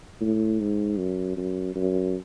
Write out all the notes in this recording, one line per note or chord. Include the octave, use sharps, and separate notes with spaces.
A2
G#2
F#2
F#2
F#2